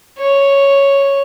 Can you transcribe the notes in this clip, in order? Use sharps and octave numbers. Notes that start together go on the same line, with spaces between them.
C#5